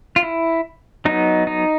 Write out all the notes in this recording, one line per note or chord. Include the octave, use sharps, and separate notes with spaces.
F4
E4
F#3 B3 D#4
D#4